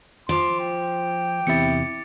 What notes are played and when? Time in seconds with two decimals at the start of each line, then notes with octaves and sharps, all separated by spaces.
0.29 F3 C6 D6 D7
0.60 G5
1.47 E2 C3 E4 A6 C#7